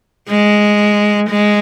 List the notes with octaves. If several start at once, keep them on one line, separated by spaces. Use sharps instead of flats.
G#3
G#3